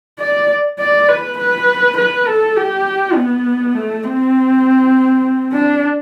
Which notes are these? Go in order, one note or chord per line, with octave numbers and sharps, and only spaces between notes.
D5
D5
B4
B4
B4
A4
G4
B3
A3
C4
D4